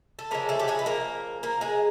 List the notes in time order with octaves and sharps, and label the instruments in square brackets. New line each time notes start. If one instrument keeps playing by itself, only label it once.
[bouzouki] A4
C#3 F3 G#3 A#3 A#4
A3 A4
G4
G#3 G#4
B4
A#3 A#4
A#3 A#4
G#3 G#4